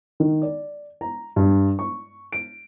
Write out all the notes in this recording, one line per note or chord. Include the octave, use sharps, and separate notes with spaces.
D#3
D5
A#5
G2
C#6
D7